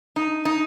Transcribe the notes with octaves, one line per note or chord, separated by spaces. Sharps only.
D#4
D#4